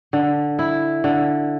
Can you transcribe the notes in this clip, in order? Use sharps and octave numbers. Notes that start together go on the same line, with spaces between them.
D3
E4
D3